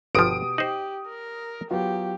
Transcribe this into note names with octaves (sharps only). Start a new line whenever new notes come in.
G1 B2 F3 B3 G4 D#6 D7
D#4 G4 C5 F#7
A#4
F#3 B3 F4 G4